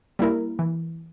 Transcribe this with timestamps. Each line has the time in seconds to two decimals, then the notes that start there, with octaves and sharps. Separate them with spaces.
0.19 G3 A#3 E4 A#4
0.59 E3